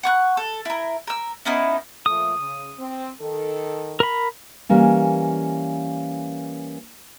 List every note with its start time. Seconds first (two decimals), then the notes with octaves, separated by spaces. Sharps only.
0.03 F#5 C#6 F#6
0.37 A4
0.65 E4 A#4
1.07 A#4 E6
1.45 B3 C#4 D#4 E4
2.06 A#2 F3 A3 D#6
2.38 C#3
2.78 C4
3.20 D#3 A4
4.00 A#4 B5
4.69 E3 G3 A#3 C#4